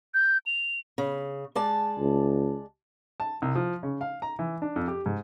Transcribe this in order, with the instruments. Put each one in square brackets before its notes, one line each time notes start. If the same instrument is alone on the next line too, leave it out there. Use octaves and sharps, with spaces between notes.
[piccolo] G6
F7
[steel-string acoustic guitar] C#3
G#3 D5 A5
[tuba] C#2
[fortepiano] A5
C2
F3
C#3
F5
A#5
E3
D4
F2
G4
G#2